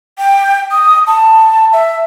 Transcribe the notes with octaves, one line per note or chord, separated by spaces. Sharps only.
G5
D#6
A5
E5